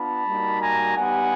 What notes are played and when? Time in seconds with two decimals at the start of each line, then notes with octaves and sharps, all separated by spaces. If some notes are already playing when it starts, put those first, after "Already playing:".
Already playing: B3 D4 F4 A5 B5
0.27 G3 A#3 D#4 F#4
0.61 G#5 A#5
0.97 G3 B3 D#4 G4 F#5 G#5